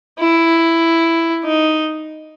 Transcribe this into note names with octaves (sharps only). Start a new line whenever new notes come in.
E4
D#4